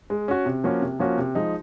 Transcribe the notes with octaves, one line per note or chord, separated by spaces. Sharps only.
G#3
C#4 F#4
C3
F3 A#3 C#4 F#4
C3
F3 A#3 C#4 F#4
C3
F3 G#3 D#4